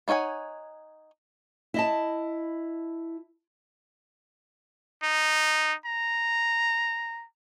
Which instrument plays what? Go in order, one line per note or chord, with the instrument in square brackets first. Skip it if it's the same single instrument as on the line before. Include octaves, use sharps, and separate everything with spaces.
[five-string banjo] B3 D#4 C#5 F#5 G#5
[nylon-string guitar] E4 D#5 A5
[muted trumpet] D#4
A#5